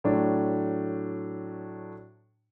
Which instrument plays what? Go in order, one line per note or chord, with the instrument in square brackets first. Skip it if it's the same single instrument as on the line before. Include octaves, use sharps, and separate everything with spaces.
[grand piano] A2 F#3 D4